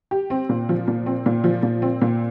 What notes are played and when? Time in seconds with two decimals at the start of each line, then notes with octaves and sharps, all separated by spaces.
0.11 G4
0.30 C4
0.49 A#2
0.69 F3
0.88 A#2
1.06 C4
1.26 A#2
1.44 F3
1.63 A#2
1.82 C4
2.02 A#2